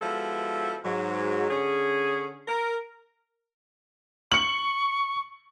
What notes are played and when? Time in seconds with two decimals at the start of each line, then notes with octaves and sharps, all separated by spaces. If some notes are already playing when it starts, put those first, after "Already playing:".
0.02 F3 G#3 B3 E4 F#4 A4
0.85 G#2 F#3
1.50 D3 C#4 G#4
2.48 A#4
4.32 C#6 C#7 F#7